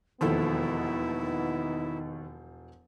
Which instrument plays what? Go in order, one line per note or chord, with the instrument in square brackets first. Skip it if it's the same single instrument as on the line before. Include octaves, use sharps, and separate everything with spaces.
[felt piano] E1 F3 A4 [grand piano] D#2 [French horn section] B3 D#4 [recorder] E4